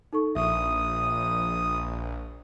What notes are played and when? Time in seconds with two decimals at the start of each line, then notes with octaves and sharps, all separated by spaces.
0.13 D#4 A4 C#6
0.35 A#1 E5 D#6